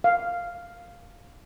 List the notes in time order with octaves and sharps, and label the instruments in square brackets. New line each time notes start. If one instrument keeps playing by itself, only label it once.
[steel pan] F5